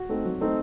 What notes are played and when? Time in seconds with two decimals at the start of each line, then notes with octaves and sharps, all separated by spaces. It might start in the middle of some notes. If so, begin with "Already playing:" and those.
Already playing: F#4
0.09 A3 C4 D#4
0.25 F#3
0.41 A3 C4 D#4